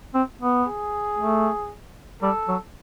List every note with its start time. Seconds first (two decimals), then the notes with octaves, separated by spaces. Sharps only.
0.15 C4
0.41 B3
0.67 G#4
1.18 A3
2.23 G3 A4
2.48 F#3